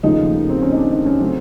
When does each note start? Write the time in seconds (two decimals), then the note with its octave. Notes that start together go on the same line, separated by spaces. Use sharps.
0.03 D#2 C#3 F3 A3 D#4
0.50 C4
0.62 C#4
0.72 D#4
0.76 D4
0.91 D#4
1.06 C#4
1.20 C#3 F#3 A3 C4